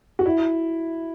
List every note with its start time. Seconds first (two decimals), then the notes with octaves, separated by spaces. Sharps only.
0.19 F#4
0.26 E4